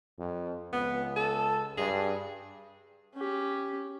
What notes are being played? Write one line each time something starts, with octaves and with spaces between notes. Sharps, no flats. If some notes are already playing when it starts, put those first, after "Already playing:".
F2
C#2 B3
A4
G2 G#4
C#4 G4